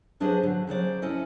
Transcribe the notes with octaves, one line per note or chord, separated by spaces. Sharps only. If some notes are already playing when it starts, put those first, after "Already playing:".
F#3 D4 G#4 B4 C5 D#5
D3 F#3
C#3 F#3 C5 D5
C#4 E4 A4 D#5